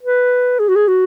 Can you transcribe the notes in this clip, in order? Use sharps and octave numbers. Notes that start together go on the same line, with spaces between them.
B4
G#4
F#4
G#4
F#4